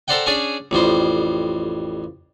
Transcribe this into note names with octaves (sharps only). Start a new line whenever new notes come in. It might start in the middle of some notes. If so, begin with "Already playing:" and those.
A4 A#4 C5 D5 F#5 G5
C#4 D4 G#4 D5
A1 F2 G3 C5